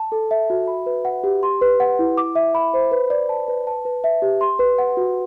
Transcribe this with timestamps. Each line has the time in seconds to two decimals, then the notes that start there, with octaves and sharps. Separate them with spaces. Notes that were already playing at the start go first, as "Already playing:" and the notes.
Already playing: A5
0.12 A4
0.31 E5
0.50 F#4
0.67 B5
0.86 B4
1.05 F#5
1.24 G4
1.43 C6
1.61 B4
1.80 F#5
1.99 E4
2.17 D6
2.35 E5
2.55 B5
2.74 C5
2.91 B4
3.10 D5
3.29 A5
3.48 B4
3.67 A5
3.85 B4
4.04 E5
4.22 G4
4.41 C6
4.59 B4
4.78 F#5
4.97 F#4